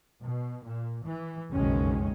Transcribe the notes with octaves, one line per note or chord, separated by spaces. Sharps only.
B2
A#2
E3
F#1 B1 F2 D#3 G#3 C#4